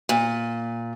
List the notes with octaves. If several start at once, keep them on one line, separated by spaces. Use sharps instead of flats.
A#2